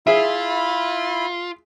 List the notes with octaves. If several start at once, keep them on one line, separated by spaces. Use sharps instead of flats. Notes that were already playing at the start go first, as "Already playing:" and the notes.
E4 F4 G#4 E5 B5